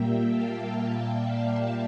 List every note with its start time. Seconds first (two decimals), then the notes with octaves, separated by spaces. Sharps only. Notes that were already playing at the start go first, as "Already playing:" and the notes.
Already playing: A#2 G3 A#3 E5 G5
0.28 F5 A5
0.75 E5 G5
1.20 D5 F5